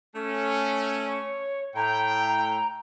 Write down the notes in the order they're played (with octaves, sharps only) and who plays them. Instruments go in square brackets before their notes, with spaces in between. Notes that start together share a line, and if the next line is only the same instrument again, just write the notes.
[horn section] A3 C#4
[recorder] C#5
[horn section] A2 G5 [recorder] A#5